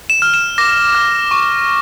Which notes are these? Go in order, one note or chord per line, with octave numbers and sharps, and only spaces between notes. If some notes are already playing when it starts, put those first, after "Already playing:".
E7
F6
E7
D6 A#6
F6
C#6